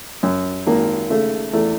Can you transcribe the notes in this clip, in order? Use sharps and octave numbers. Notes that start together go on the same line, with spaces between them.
F#2
G#1 A#3
C#3 A3
E2 A3